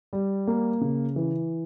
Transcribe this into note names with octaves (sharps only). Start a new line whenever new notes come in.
G3
A#3
C#3
E3